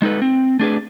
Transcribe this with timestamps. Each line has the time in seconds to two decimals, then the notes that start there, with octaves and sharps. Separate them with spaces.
0.02 G#3 D#4 A4 B4
0.22 C4
0.59 A3 D4 G#4 B4